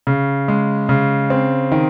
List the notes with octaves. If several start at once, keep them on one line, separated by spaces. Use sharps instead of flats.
C#3
G#3
C#3
C4
D#3